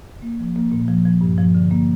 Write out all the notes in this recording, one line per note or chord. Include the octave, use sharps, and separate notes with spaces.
A#3
F3
A#3
A#2
F3
F3
G2
F3
D3
A#3